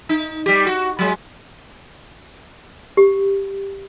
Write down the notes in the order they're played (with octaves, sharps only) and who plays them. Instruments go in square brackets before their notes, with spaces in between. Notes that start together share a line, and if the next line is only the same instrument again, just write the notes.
[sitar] D#4
G3 G4
F#4
F#3 G#3
[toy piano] G4